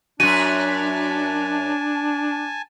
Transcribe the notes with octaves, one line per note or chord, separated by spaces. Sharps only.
F#2 D4 F#4 G#5 A5 D#7